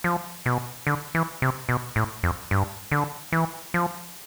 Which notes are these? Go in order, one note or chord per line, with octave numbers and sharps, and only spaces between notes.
F3
B2
D3
E3
C3
B2
A2
F2
G2
D3
E3
F3